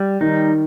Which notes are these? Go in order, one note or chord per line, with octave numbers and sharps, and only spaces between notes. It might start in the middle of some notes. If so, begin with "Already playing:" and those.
Already playing: G3
D#3 D#4